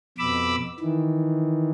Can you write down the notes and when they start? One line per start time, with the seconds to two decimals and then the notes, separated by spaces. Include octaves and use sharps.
0.18 F2 B2 B5 D6 E6
0.80 D#3 E3